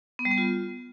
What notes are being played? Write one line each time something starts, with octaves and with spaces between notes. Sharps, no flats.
B3
G3
B3
F4